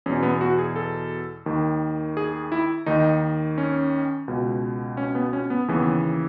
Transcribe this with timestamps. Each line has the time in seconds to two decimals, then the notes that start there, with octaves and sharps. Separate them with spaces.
0.06 E2 C#4
0.09 B2
0.23 B3
0.41 F#4
0.59 G#4
0.76 A4
1.46 D#2 D#3
2.17 G#4
2.52 E4
2.86 D#2 D#3 D#4
3.58 C#4
4.28 C#2 B2
4.97 C#4
5.15 B3
5.33 C#4
5.50 B3
5.68 D#2 C#3 E3 B3